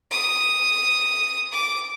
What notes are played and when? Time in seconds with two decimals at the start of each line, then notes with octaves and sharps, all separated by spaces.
0.11 D#6
1.52 D6